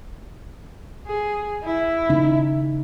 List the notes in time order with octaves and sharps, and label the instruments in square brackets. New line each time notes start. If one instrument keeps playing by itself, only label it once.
[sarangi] G#4
E4
[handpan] C#3 D#4